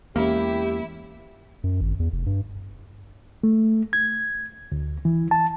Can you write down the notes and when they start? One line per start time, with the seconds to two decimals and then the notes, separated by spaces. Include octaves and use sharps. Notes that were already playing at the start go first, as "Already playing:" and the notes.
0.16 E2 G#3 A#3 C#4 E4 G4
1.64 F#2
1.81 G#1
2.00 E2
2.12 F1
2.26 G2
3.43 A3
3.93 G#6
4.72 D2
5.05 E3
5.31 A5